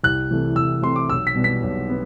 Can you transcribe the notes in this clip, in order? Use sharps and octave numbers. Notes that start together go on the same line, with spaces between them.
C2 F#6
C3 E3 A3
C2 E6
C3 E3 A3 C6
D6
B1 E6
B6
B2 G3 B3
B6
B1
B3